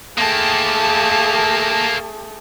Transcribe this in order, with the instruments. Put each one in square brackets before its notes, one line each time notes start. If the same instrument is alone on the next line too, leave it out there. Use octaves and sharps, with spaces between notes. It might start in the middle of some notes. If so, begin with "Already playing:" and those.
[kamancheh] A3 G#4 [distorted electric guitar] A#3 G4 [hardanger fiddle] A5